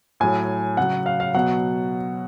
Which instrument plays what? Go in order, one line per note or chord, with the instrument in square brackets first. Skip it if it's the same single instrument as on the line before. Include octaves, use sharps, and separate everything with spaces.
[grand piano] A2 F#3 G#5
C#3 F#3 F#5
F5
F5
B2 F#3 F#5